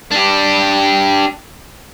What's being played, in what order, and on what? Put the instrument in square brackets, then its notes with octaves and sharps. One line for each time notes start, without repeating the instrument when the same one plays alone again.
[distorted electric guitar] D4 G4